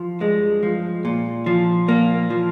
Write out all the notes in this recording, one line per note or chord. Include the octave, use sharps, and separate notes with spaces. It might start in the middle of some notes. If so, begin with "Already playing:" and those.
Already playing: F3
G2 G#3
F3
A#2
F3
A#2 A#3
F3